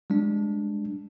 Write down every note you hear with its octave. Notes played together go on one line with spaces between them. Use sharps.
G3 G#3 D4